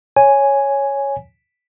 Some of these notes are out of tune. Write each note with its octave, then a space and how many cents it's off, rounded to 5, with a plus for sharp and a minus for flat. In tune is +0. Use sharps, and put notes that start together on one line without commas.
C#5 +0 G#5 +0